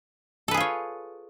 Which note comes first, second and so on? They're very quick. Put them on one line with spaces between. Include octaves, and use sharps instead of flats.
A4 B4 G#4 F4 C#5